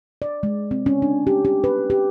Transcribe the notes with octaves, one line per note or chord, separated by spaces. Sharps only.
D5
G#3
C4
C#4
D4
G4
G4
B4
G4